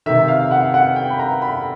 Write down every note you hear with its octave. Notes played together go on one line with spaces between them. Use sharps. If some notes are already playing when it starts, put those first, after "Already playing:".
C3 D#3 E5
F5
F#5
F#5
G5
B5
A#5
B5